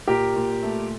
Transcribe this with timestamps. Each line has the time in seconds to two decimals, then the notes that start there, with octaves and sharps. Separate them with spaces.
0.08 A#2 G4 A#4
0.36 A#2
0.63 A3